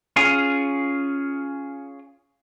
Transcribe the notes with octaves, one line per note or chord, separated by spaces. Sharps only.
C#4 F4 G#4